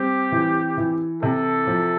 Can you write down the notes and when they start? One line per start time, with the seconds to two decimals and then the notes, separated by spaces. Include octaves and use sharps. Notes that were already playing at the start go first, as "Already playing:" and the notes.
Already playing: G3 C4 G4
0.32 E3
0.77 E3
1.22 C3 A4
1.67 F3